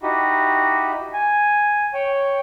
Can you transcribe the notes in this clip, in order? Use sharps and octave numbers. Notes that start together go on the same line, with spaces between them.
D#4 E4 F#4 G4
G#5
C#5 G5